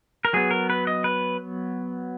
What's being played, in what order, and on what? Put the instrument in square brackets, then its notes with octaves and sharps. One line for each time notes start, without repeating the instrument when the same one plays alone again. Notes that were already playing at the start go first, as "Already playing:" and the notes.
[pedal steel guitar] A#4
F#3 B3 G#4
A#4
B4
D#5
B4